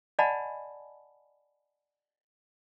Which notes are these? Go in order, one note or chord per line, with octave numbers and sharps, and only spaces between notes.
D5 D#5 F#5 G#5 A5 B5